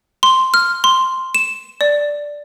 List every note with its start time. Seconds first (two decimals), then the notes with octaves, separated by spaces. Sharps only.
0.23 C6
0.54 F6
0.84 C6
1.35 E7
1.81 D5